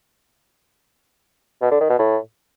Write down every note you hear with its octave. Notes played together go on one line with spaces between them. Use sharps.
B2
D3
D#3
B2
A2